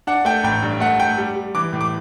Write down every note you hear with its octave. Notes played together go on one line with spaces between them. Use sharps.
D4 F#5
A3 G5
A1 G5
G2
A3 F#5
A3 G5
G3
G3
E3 D6
A2
D6